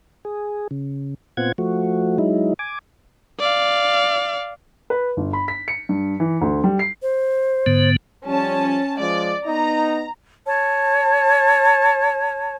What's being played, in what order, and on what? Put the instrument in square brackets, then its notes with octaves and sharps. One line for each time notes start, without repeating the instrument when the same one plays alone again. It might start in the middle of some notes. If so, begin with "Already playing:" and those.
[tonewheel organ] G#4
C#3
A#2 B3 C4 F4 F#5 G#6
F3 A3 F#4
F#3 G#3 D#4 E4
G#5 D6
[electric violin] D5 F5
[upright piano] B4
G1
B5
B6
C#7
G2
E3
D2
G3
C7
[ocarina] C5
[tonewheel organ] G#2 D3 B3
[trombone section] F3 G3 [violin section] C#4 A5
[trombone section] F3 G#3 [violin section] D5
[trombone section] B3 D#4 [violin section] A#5
[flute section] C#5 A5